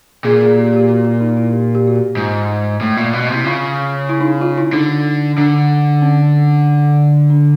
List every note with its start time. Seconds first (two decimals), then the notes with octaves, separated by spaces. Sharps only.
0.24 A#2 G#4
0.41 G#4
0.57 G4
0.73 G4
0.89 F#4
1.05 F4
1.21 D#4
1.37 E4
1.53 G4
1.75 G4
1.87 F#4
1.96 G4
2.17 G#2 F4
2.81 A2
2.97 A#2
3.13 B2
3.29 C3
3.35 E4
3.45 C#3 F4
4.09 E4
4.21 D#4
4.25 E4
4.41 F4
4.58 E4
4.73 D3 D#4
5.38 D3 D4
6.02 C#4
7.30 D4